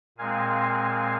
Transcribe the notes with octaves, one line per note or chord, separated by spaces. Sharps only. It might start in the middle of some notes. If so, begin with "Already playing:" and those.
A#2 G#3 C4 F5 G#5